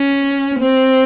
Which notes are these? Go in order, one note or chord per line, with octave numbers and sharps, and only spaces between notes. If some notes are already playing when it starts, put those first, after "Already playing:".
Already playing: C#4
C4